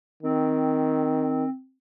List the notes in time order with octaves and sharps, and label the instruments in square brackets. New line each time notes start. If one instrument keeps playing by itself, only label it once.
[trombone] D#3 [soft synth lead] C4